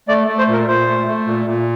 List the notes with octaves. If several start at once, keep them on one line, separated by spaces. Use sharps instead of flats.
A3 D5
A3
C5
A#2 A#4
A#2 C5
A3
A3
A#2
A#2